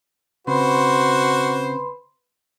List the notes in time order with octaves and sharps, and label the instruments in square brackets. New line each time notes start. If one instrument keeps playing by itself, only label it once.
[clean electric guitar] C#3 C4 [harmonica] F#4 C5 [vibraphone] B4 B5 C6